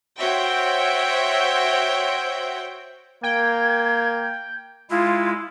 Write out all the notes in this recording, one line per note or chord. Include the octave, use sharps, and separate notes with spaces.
F#4 C5 C#5 E5 G5
A#3 G5 G#6
G#3 E4 F4